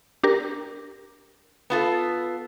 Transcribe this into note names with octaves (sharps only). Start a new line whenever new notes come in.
D4 G4 A#4
B3 F4 A4